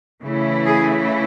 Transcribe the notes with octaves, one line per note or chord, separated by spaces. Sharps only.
C#3 E3 A3 E4
G#4